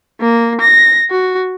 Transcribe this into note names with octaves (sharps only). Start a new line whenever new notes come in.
A#3
A#6
F#4